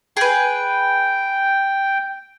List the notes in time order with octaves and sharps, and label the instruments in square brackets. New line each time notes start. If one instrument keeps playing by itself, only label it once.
[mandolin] G#4 B4 [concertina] G5